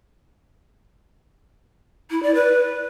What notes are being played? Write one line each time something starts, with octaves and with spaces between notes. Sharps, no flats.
E4
D5
B4